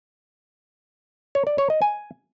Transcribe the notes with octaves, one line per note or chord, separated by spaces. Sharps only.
C#5
D5
C#5
D#5
G#5